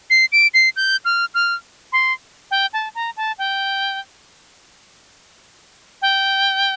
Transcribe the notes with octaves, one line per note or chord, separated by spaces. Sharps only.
C7
D7
C7
G6
F6
F6
C6
G5
A5
A#5
A5
G5
G5